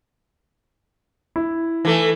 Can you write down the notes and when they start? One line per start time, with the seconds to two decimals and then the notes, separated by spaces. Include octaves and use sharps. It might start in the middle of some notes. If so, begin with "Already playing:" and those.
1.36 E4
1.85 E3 A3